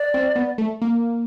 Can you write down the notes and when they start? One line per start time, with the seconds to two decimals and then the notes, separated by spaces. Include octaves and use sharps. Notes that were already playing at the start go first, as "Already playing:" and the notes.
Already playing: D5
0.14 C4
0.36 B3
0.58 A3
0.82 A#3